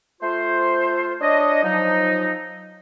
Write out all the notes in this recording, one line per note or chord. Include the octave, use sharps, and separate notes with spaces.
A3 F4 C5
D4 C#5 D#5
F3 F#3 D#4